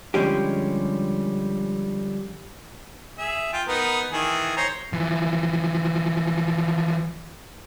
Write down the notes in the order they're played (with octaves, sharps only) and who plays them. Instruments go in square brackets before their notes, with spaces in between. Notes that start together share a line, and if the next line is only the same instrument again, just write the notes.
[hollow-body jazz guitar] D3 F3 G3 G#3 C#4 G4
[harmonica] G#4 E5
F4 G5
B3 D#4 A#4
D#3 E3 G#4
C5 C#5 A#5
[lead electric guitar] E3 F3